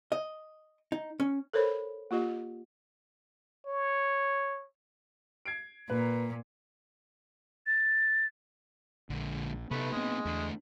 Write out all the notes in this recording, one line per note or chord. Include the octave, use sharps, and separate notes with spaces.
D#5
D#4
C#4
A4 A#4 C5 C#5 B5
A#3 F4 G4 D#5
C#5
G#6 C7 D7
A#2 B4
A6
A#1 D3 G#3
C3 A3 B3 D#4 B4
G#3 A#3 C4 D#5
E2 A3 D4